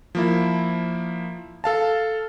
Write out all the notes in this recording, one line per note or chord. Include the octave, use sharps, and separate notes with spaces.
F3 A#3 E4
A4 F5 A5